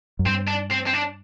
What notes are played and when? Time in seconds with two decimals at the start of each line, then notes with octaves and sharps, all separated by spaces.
0.19 F#2
0.26 G2 C4
0.48 D4
0.71 C4
0.87 C4
0.94 D4